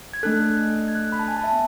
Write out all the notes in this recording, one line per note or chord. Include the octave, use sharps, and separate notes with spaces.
G#6
A3 D4 A4 F#6
G#6
F#6
B5
A5
G#5
A5
E5
B3